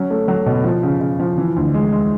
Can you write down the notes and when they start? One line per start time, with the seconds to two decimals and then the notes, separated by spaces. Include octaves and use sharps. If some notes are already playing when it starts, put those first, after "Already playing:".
Already playing: F#3 C#4
0.10 A3
0.28 F#3
0.46 B2
0.64 F3
0.83 C#3
1.01 C#3
1.20 F3
1.38 E3
1.56 D2
1.74 G#3
1.92 G#3